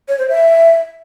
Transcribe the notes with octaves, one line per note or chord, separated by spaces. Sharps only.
C#5
C5
E5